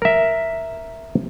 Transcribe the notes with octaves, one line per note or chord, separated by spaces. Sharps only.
A#4 E5